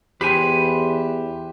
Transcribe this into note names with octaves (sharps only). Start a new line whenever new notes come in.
E2 G4 B4 C5 G#5